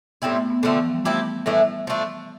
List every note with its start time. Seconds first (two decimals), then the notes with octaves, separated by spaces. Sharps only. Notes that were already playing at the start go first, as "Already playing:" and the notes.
0.22 A2 G3 B3 C4 E4
0.36 A3
0.50 B3
0.63 D3 F3 A3 C4
0.75 E3
0.85 F3
0.95 G3
1.04 F3 A3 C4 E4 G4
1.46 A2 E3 G3 A3 D4
1.87 F3 A3 D4